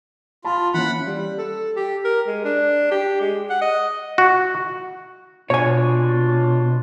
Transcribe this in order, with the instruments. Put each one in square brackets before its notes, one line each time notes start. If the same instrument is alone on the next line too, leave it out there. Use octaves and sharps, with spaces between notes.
[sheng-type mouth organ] F4 [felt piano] A5 B5
[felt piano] E3 A#3 C#4 [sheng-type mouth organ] F#5 B5
[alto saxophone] G3
A4
G4
A#4
G#3
D4
G4
G#3
F#5
D#5
[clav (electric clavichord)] F#4
[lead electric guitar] B2 [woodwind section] D4 F4 [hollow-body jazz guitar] C#5 G#5